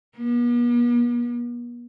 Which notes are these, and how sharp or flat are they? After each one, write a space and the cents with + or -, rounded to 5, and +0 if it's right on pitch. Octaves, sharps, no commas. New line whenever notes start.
B3 -45